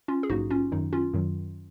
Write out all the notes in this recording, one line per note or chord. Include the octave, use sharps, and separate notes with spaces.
C#4 F4
G#4
A#1 G#2 F#3 A#3 D#4 F#4
C#4 F4
F#2 D#3 F#3 D#4
C#4 F4
F#2 D#3 F#3